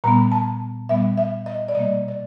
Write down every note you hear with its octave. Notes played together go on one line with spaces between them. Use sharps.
A#2 G3 B3 A#5
A5
A#2 G3 B3 E5
E5
D#5
D5
B2 G3 A#3 D#5
D5